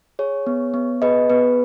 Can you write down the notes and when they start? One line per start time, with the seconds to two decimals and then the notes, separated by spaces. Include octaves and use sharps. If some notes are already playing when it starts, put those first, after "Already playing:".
0.19 G#4 C#5
0.47 B3
0.74 B3
1.02 G#4 B4 D#5
1.30 B3 B4